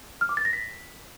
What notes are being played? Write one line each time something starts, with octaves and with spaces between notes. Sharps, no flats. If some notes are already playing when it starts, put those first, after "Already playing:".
F6
D6
A6
A#6
B6